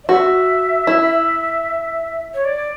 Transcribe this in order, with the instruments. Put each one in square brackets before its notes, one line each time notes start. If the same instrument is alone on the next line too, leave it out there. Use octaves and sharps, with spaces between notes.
[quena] D5
[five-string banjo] F#4 [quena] E5
[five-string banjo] E4
[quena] C#5
D5